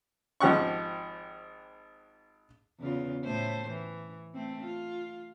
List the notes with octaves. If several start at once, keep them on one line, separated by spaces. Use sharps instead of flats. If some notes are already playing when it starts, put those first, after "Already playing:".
G#1 F3 G4 F#5 C#6
E2 C#3 F4
A2 A3 C5
E3
A3 C4
F4